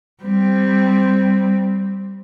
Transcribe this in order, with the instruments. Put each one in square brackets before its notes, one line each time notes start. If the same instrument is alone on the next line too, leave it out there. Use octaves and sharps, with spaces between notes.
[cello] G3 C4